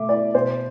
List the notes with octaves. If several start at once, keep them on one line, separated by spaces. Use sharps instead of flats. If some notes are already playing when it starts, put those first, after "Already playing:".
Already playing: B2 A3 E5 D6
E4 D5
B2 C5